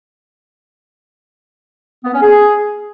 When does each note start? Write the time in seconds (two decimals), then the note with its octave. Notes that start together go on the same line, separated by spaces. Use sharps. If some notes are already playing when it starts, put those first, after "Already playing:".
2.04 B3
2.13 C#4
2.22 G#4